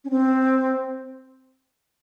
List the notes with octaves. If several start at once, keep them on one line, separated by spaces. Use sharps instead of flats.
C#4
C4